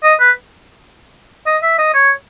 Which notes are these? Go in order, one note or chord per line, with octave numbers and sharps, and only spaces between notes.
D#5
B4
D#5
E5
D#5
C#5